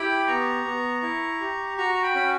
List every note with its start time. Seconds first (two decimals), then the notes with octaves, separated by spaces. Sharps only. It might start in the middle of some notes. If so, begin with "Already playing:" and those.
Already playing: E4 G4 G5 B5
0.27 B3 A#5 C#6
0.65 B3
1.02 E4
1.41 G4
1.77 F#4 A#5 C#6
1.95 A#5
2.03 G5 B5
2.15 C#4 B5